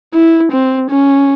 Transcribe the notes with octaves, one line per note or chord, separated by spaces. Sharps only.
E4
C4
C#4